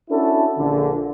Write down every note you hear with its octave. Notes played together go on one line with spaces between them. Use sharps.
C#4 D4 E4 F#4 A4
A#1 D3